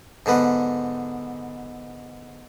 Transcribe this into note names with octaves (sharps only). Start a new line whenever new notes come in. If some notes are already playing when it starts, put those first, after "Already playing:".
G#2 D3 B3 B4